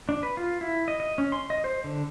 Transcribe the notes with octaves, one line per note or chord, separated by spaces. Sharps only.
D4
B4
F4
E4
D#5
D#5
C#4
C6
D#5
C5
D3